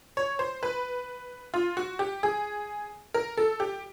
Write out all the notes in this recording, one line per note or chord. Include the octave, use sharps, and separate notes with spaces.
C#5
C5
B4
F4
F#4
G4
G#4
A#4
A4
G4